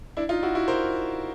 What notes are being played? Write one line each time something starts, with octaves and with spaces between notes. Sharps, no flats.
D4 E4
D#4 F4
E4 F#4
E4 F#4
A#4 C5